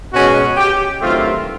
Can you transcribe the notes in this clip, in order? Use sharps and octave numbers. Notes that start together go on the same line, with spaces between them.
B2 G#3 C#4 F#4
G4
G2 D#3 F#3 A3 C4 F4